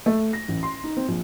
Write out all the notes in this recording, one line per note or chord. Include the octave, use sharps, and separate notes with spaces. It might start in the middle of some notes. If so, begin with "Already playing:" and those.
A3
A#6
A1
C6
D#4
C4
A#1